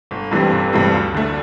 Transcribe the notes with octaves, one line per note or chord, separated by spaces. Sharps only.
G1
G2 E3 G3 C4
G1
G2 E3 G3 C4
D2
D3 A3